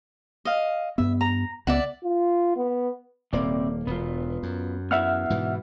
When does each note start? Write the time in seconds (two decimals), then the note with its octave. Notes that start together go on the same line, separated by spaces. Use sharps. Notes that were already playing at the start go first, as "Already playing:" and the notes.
0.45 D#5 F5
0.98 G2 B3 E5
1.21 A#5
1.67 C#2 B3 D5 E5 F#5
2.04 F4
2.56 B3
3.33 D#1 C3 A#3 D5
3.87 E1 B3 F4
4.43 F#2
4.91 B3 E4 E5 F#5 F6
5.30 G#2 B2 E3